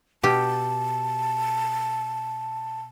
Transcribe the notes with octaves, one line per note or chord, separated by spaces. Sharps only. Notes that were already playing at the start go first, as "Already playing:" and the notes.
B2 G4 A5